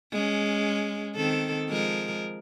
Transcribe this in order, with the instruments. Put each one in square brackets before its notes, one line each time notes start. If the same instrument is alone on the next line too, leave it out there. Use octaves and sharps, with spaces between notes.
[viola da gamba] G#3 C#4
D#3 C4 A4
F3 G#3 A#4